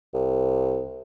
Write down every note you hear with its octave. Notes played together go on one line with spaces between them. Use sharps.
C2